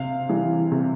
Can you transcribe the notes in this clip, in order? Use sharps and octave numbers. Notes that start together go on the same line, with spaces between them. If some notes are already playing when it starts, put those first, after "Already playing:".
Already playing: C3 F5
E3 G3
C3